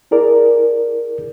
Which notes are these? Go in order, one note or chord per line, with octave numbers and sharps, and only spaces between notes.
E4 G#4 A#4 D5